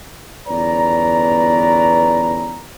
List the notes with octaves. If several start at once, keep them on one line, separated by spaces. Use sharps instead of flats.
G1 E2 C#4 B4 D5 A#5